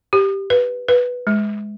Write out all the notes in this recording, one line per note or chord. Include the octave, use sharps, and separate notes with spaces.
G4
B4
B4
G#3